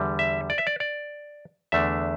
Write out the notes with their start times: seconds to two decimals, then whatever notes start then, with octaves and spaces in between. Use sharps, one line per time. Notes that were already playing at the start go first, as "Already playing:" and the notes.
Already playing: E2 D3 G3
0.19 E5
0.50 D5
0.58 E5
0.67 D5
0.80 D5
1.72 E2 D3 A3 D4 E5